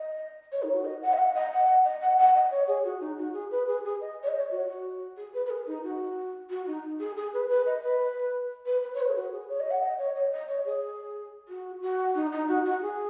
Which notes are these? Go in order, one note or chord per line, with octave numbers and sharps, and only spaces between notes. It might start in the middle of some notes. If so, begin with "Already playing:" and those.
Already playing: D#5
C#5
D#4
F#4
D#5
F#5
D#5
F#5
D#5
F#5
D#5
F#5
F#5
D#5
C#5
G#4
F#4
D#4
F#4
G#4
B4
G#4
G#4
D#5
C#5
D#5
C#5
F#4
F#4
G#4
B4
B4
G#4
D#4
F#4
F#4
D#4
G#4
G#4
B4
B4
D#5
B4
B4
B4
C#5
B4
G#4
F#4
G#4
C#5
D#5
F#5
D#5
C#5
D#5
D#5
C#5
G#4
F#4
F#4
D#4
D#4
F#4
F#4
G#4